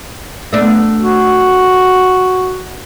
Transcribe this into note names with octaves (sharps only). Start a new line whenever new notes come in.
A3 B3 D4
F#4